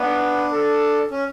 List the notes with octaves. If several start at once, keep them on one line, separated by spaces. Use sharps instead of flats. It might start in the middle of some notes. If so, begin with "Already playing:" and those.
Already playing: B3 D4
A4
C#4